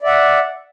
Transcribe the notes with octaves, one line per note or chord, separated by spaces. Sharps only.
D5 E5 F#5